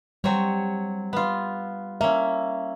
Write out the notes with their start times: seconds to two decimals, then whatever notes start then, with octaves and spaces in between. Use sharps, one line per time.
0.24 F#3 G3 C4 C#5
1.13 B3 F4
2.01 A#3 C#4 E5